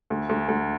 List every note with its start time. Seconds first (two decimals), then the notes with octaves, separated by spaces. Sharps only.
0.10 D2
0.29 D2
0.48 D2